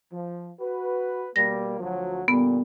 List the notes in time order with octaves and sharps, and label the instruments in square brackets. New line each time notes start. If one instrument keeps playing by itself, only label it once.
[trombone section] F3
F#4 B4
[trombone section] B2 G3 A#3 [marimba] A#6
[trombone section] D2 F3 F#3
[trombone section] A#2 D3 G3 [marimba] B3